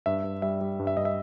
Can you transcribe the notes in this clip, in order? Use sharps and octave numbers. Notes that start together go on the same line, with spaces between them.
G2 E5
G2
G3 E5
G3
G2
E5
G2 D#5
E5